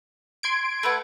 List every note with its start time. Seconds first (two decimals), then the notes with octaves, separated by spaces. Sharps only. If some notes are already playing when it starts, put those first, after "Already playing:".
0.43 C6 G#6 D7
0.83 A3 B4 F#5